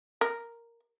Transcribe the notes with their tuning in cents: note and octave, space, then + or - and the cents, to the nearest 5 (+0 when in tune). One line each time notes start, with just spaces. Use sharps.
A#4 +0